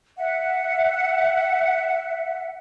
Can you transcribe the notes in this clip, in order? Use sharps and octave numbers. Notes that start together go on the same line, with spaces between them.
E5 F#5